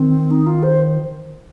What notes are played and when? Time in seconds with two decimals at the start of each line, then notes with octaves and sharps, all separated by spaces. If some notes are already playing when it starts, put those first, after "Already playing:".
Already playing: D#3 C4
0.30 D#4
0.46 F4
0.63 C5